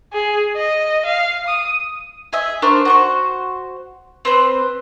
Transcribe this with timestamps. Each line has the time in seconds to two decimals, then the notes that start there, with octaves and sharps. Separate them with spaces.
0.13 G#4
0.56 D#5
1.05 F5
1.48 D#6
2.33 G#4 D#5 E5
2.62 D4 A#4 C5 C#6
2.85 F#4 C5 C#6
4.25 C4 B4 C5